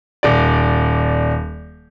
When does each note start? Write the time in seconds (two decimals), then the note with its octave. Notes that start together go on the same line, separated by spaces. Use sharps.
0.23 D#1 D5